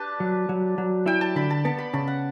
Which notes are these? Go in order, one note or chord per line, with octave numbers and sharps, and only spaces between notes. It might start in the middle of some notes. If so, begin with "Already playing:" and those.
Already playing: D4 G4 B4 A5
F#3
F#3
F#3
E4 G5
A5
D3 B5
A5
B3 A5
B5
C#3 A5
F#5